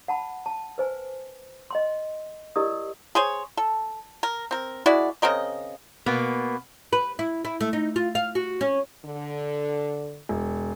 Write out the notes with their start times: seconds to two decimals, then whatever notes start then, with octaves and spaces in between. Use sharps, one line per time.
0.08 F#5 A5 B5
0.46 A5
0.78 B4 C5 G#5
1.71 D#5 G5 C6
2.56 E4 G4 A#4 D5 D#5 D#6
3.15 G#4 C5 C#5
3.57 A4
4.23 A#4
4.51 C4 A#4
4.86 G#3 E4 F#4 D5
5.22 C#3 C4 A#4 D#5
6.06 B2 A#3 B3
6.93 B4
7.19 E4
7.45 E4
7.61 A3
7.73 D#4
7.96 F4
8.15 F5
8.35 F#4
8.61 C#4
9.06 D3
10.29 E1